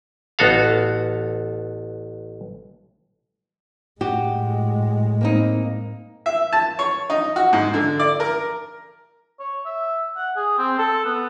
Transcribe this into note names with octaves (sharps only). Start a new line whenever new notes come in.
A1 B3 F#4 A4 F5
A2 G#3 F#4 G4
A#3 C4 D#4
E5
A5
C#5
D#4
F#4
G#2
D3
D5
A#4
C#5
E5
F#5
G#4
C4
A4
B3